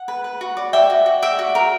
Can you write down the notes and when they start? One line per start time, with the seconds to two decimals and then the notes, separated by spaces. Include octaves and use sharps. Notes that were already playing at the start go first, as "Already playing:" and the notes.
Already playing: F#5
0.08 B4
0.24 B4
0.41 F#4
0.57 D5
0.73 D5 E5 G5
0.90 F#4
1.06 F#4
1.22 D5 E5 G5
1.39 F#4
1.55 A#4